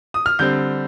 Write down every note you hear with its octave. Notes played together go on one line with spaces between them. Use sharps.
D#6
F6
D3 G3 C4 G6